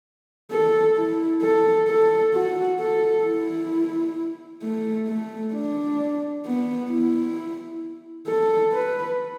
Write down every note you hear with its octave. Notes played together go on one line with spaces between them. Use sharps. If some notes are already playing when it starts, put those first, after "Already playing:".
A4
E4
A4
A4
F#4
A4
E4
A3
A3
D4
B3
E4
A4
B4